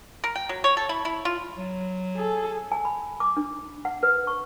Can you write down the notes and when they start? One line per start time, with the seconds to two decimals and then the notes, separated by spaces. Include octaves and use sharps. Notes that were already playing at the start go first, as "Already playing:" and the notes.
0.24 A#4
0.36 G5
0.49 F#3
0.64 C#5
0.77 A4
0.89 E4
1.05 E4
1.25 F4
1.58 F#3
2.15 G#4 A4
2.72 G#5
2.85 B5
3.20 D6
3.37 D4
3.85 F#5
4.03 B4
4.27 C#6